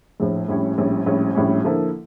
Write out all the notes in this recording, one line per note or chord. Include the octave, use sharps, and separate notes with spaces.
A#1 A2 F3
A#1 A2 G3 C#4
A#1 A2 G3 C#4
A#1 A2 G3 C#4
A#1 A2 G3 C#4
D3 F3 A#3 E4 A4